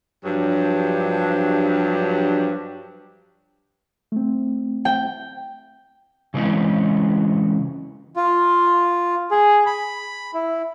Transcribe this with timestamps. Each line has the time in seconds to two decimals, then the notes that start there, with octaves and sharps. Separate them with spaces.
0.24 G2 F3 F#3 D4 G4
4.12 A3 C4
4.85 G5
6.34 C#3 E3 G#3 C4 C#4
8.16 F4
9.31 G#4
9.66 B5
10.34 E4